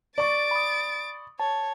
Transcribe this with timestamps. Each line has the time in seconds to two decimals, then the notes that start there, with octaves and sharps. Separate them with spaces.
0.18 D5 C#6 A6 D7
0.51 B5 D#6
1.40 C#5 A5